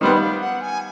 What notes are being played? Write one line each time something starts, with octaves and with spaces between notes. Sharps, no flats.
D#3 G3 B3 C5
E5
F5
F#5
G#5